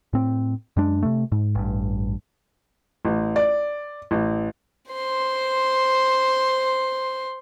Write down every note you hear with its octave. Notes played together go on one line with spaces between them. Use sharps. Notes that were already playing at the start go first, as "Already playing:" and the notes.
A2 C4
F#2 G#3 D4
C3 A3
G#2
A1 G2
A1
D5
A1
C5 C6